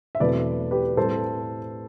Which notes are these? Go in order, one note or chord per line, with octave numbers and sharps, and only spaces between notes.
E5
E2 B2 F#3 A3 C4 B4 D5
G4 B4
A2 G3 C4 A4 C5